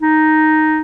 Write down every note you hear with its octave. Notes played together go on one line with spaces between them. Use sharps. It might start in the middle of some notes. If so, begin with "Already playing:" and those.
D#4